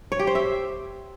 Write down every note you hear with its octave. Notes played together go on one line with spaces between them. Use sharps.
C#5
G4
C5
E5